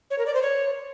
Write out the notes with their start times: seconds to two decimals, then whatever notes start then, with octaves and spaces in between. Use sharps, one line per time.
0.11 C#5
0.18 A#4
0.26 D5
0.34 C5
0.42 C#5